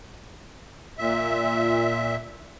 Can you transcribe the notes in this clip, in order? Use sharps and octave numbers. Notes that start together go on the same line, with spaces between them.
A#2 E5